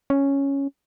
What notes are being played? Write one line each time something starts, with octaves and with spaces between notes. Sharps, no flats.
C#4